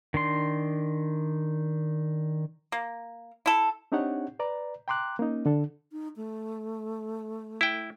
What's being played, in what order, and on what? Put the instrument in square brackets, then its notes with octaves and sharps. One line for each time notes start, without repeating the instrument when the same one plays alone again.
[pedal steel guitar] D#3 D4 C6
[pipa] A#3
E4 A4
[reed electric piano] C4 D4 D#4 G4 C#5 F#5
B4 D5 A#5
G5 A#5 C6 D6 F#6
A#3 C#4 D#4
D3 D4 A4
[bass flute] D#4
A3
[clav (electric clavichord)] E4 G5